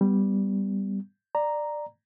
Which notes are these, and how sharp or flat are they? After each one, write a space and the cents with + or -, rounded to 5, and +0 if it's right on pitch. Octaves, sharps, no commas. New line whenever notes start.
G3 +0 B3 +15
D5 +15 A#5 +0